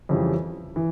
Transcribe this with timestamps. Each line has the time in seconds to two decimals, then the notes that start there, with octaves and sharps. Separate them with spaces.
0.09 F2 C#3 E3 G3
0.76 E3